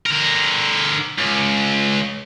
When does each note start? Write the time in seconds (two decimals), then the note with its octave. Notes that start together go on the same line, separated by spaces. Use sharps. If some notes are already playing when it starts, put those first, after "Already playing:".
0.06 D3 A#4
1.18 C#2